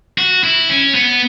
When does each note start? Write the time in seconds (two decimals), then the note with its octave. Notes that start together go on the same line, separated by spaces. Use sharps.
0.18 F#4
0.44 E4
0.69 C#4
0.95 B3